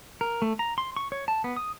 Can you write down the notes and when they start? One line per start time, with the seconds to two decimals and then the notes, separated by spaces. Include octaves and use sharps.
0.21 A#4
0.42 A3
0.59 A#5
0.78 C6
0.96 C#6
1.12 C#5
1.28 A5
1.44 B3
1.56 D#6